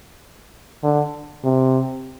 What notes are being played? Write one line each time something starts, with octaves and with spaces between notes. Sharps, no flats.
D3
C3